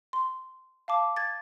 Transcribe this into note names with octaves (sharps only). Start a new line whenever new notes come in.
C6
F5 A5 D6
G#6 A6